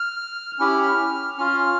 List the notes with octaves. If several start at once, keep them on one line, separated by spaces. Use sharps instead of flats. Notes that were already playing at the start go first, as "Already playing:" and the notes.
Already playing: F6
C#4 E4 G4 F6
C#4 F4 F6